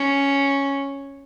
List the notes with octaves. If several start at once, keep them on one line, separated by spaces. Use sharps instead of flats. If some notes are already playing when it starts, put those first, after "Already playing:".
Already playing: C#4